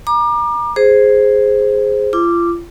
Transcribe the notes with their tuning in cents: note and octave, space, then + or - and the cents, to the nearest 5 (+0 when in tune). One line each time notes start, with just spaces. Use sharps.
A#5 +30 D6 +35
G#4 +0 C5 +0
F4 -35 D6 +0